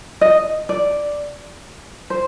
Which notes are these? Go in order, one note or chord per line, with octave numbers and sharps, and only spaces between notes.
D#5
D5
C5